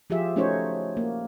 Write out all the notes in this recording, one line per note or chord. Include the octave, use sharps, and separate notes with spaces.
F3 F4 G4 G#4 E5
A3 C#4 D#4 F#4 C5 C#5
A#3